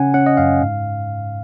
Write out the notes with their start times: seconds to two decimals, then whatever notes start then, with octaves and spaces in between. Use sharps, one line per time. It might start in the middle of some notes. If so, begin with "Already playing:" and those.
Already playing: C#3 C#4 F#5 G#5
0.14 C#4 F#5
0.26 D#5
0.37 F#2 F5
0.62 G#2